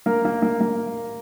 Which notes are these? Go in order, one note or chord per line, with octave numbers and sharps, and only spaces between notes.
A#3 A#4
A#3
A#3
A#3